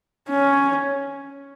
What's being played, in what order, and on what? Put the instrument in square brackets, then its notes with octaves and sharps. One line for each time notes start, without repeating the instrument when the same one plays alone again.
[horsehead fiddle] C#4